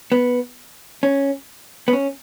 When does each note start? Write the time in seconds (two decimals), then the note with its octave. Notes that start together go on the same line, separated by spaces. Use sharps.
0.12 B3
1.03 C#4
1.88 B3
1.93 C#4